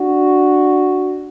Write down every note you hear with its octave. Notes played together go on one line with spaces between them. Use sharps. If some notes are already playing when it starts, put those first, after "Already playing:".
Already playing: D4 F#4